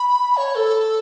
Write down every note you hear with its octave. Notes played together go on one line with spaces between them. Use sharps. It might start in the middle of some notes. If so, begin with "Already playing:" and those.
Already playing: B5
C#5
A4